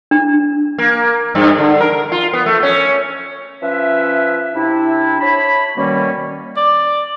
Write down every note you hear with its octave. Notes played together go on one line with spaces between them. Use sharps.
D4
A#3
G2
D3
A#4
F4
B3
A3
C#4
F3 C#4 B4 E5
C3 D4 E4
C#5 A5 B5
B2 D#3 G3 A#3 C#4
D5